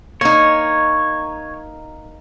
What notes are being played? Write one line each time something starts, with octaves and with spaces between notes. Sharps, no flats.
A#3 D#4 C#5